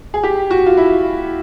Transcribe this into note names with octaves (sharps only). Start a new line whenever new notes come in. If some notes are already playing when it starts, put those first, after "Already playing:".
G#4
G4
F#4
F4
E4